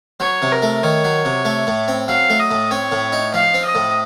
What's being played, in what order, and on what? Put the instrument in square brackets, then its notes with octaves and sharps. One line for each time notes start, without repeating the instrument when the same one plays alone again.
[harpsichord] F#3 [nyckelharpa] C#5
[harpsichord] C3
[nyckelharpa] A#4
[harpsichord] A3
[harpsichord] D#3 [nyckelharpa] C#5
[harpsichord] F#3
C3
A3
A2
C4
[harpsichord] F#3 [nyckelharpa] F5
[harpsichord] A3
[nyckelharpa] D#5
[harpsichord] A2
[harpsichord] C4 [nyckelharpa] C#5
[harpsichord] A2
D#4
[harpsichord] F3 [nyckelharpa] F5
[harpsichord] C4
[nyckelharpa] D#5
[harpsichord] A2